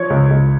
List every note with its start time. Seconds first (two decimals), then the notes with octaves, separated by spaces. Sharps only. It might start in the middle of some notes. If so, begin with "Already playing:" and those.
Already playing: F3 C#5
0.10 C#2
0.30 C#2